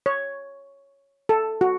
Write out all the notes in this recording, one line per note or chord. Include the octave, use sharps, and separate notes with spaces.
C#5
A4
F#4